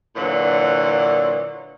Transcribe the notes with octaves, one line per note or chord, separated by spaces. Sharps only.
A#2 D3 E3 F#3